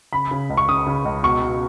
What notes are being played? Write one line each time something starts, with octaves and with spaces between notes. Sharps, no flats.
C#3 B5
C#3
C#2
C#6
C#3 D#6
C#3
C#2
B2 C#6
B2